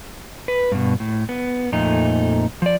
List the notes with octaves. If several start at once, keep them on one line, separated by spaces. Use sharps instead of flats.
B4
G2 B2
A2
B3
F2 A#2 A3 D#4
F3 D5